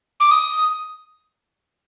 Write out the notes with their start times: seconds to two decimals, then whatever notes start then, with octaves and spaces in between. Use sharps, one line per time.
0.20 D6
0.31 D#6